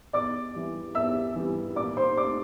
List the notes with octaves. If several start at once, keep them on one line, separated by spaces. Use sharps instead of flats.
E2 D5 D6
E3 G3
E2 E5 E6
E3 G3
A#2 D5 D6
C5 C6
A3 D4 D5 D6